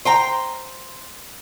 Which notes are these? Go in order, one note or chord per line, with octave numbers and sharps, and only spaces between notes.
C5 G5 A#5